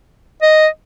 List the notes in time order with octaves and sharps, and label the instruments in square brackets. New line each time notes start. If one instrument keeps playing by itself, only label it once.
[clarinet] D#5